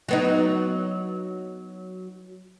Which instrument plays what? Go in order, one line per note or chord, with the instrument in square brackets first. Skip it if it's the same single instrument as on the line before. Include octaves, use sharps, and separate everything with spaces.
[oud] F#3 B3 D#4